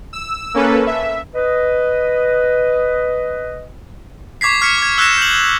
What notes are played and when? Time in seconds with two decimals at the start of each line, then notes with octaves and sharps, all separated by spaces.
0.13 E6
0.54 A#3 C#4 A4 B4
0.87 E5
1.35 B4 D#5
4.41 C#6 D6 G#6 B6 C7
4.61 C#6 F6 G#6 B6 C#7
4.78 D6 G#6
4.98 E6 F#6 G#6 A#6 E7
5.18 G6 F#7